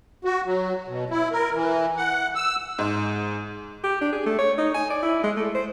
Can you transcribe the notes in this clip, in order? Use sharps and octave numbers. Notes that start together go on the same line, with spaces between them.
F#4
F#3
B2
E4
A#4
E3
F#5
E6
G#2
G4
D4
G#4
A3
C#5
D#4
G#5
D5
E4
G#3
A3
C5